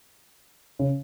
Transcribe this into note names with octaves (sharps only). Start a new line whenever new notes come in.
C#3